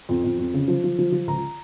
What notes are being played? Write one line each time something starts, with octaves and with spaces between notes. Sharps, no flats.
F2
F2
F2
C#3
F3
F3
F3
F3
C#2 A#5